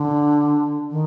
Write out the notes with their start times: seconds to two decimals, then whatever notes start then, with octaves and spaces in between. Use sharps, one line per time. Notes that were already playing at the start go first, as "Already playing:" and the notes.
Already playing: D3
0.91 D#3